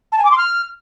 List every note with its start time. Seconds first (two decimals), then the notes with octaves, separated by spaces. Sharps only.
0.12 A5
0.19 G#5
0.25 D6
0.31 C6
0.38 F6